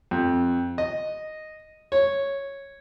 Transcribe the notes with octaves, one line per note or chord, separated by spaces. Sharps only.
F2
D#5
C#5